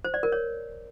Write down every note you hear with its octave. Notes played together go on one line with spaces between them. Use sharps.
C5
D5
A#4
C#5